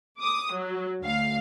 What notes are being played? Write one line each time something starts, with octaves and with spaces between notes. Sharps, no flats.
D6 D#6
F#3
D2 F5